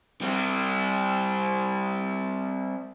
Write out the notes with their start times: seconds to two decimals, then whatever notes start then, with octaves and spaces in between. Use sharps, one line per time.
0.21 G3 C4